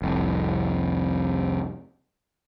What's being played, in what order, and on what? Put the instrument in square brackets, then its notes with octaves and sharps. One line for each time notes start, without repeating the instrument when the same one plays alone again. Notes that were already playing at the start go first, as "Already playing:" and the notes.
[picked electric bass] F1 C2